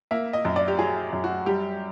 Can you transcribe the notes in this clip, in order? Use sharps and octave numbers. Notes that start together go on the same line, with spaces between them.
A#3 E5
D#5
F#2
D5
G4
F#3 G#4
F#2
F#4
G3 G4